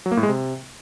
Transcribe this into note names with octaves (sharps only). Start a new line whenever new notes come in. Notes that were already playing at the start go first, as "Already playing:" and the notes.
F#3
A#3
A2
G#3
C3